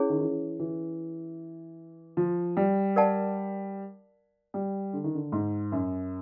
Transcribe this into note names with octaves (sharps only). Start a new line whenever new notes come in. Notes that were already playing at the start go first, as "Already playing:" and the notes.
Already playing: C#4 E4 G#4 C#5
D#3
E3
E3
F3
G3
A#4 D5 F#5 A5
G3
D3
D#3
D3
G#2
F#2